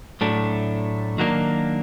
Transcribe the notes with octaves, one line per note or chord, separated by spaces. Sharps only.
A2 F#3 A3 D4
D#3 F#3 A#3 D4